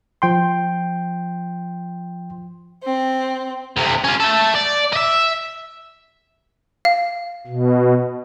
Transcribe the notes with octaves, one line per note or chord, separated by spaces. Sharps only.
F3 G5 C6
C4
D2 C3
C#4 F4
A3 A4
D5
D#5 E5
F5
B2